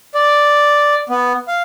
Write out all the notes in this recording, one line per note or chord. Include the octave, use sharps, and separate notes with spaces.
D5
B3
F5